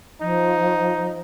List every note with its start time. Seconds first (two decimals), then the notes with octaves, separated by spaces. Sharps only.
0.22 F3 D#4